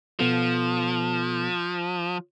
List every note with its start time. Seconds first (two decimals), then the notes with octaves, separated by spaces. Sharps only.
0.19 B2 F3 B3 A4